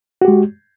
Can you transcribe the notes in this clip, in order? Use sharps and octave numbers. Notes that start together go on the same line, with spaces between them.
G#3 F#4 G4